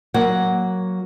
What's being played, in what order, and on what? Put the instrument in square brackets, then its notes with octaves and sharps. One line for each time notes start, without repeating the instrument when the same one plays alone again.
[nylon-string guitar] F#3 A#3 F#5